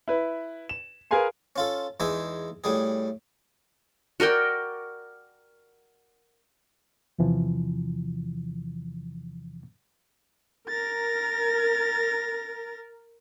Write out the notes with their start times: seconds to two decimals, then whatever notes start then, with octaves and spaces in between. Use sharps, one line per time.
0.08 E4 B4
0.69 E7
1.11 G#4 A#4 B4 F5 G#5 C6
1.56 C#4 F4 A4
2.00 E2 G#3 D#4 E5 G#5
2.64 A2 G3 G#4
4.20 F#4 A#4 D5 G5
7.18 E2 C3 E3 F3
10.68 A#4 A6 A#6